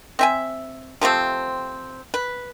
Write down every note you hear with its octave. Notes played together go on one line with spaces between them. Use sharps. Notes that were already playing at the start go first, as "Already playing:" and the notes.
C4 E5 G#5
C3 F3 A3 C4
B4